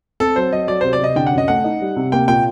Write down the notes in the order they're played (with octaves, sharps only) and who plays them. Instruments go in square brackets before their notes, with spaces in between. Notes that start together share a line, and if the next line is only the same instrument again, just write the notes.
[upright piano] C4 [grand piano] A4
[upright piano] F#3 [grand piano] C5
[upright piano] F#3 [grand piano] D#5
[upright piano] F#3 [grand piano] D5
[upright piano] C3 [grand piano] C5
[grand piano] D5
[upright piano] C3 [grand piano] D#5
[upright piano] D3 [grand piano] G5
[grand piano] F#5
[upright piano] F#2
[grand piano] D#5
[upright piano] A3 [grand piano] F#5
[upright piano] D#4
G3
C3
[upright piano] A#3 [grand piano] G5
[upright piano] A#2 [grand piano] G5